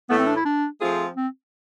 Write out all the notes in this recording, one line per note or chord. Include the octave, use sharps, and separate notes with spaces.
A2 E3 A3 B3
C4
D4
E4
D4
F3 A3 C4 F4 G#4
C4